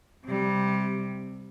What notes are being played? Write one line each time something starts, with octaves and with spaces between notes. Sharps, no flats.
C3 G3